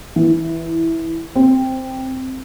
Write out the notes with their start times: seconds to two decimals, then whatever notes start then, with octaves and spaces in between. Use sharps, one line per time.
0.16 E3
1.35 C4